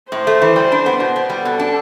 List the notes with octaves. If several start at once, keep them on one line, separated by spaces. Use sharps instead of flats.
A2 C5
A3
E3
G3
D4
B3
B2
B3
G3
B2 A4
D4